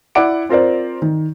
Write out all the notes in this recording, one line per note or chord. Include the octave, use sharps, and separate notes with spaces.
E4 D5 F#5 D6 D7
C4 F4 A#4 C5 D5
D#3